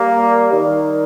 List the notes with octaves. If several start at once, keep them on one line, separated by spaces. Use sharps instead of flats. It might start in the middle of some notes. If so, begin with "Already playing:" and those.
Already playing: G3 A#3
D#3 G3